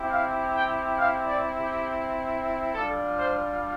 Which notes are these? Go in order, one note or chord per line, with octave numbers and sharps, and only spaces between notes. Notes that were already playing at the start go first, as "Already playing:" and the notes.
Already playing: C4 E4 G4
F5
G5
F5
D5
G4
G3 D4 F4 A4
C5